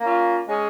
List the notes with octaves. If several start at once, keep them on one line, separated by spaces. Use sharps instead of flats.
A#3 C#4 F4
G#3 C#4 G#4